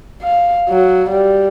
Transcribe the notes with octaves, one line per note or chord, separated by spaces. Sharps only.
F5
F#3
G3